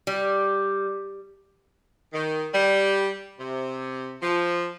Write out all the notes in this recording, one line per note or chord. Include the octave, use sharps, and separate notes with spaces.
G3
D#3
G3
C3
F3